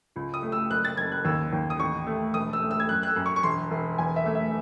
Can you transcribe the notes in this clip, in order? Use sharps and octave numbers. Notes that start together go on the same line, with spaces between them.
C#2
D#6
A3
E6
F#1 F#6
A6
F#1 G#6
F#6
D#2 E6
D#2
D#6
A1 C#6
A3
E1 D#6
E6
A3
E6
G#6
F#2 F#6
F#6
E6
F#2
C#6
C#6
E1 C6
E1
E2 G#5
E5
A3
E5